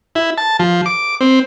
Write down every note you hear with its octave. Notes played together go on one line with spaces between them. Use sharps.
E4
A5
F3
D6
C4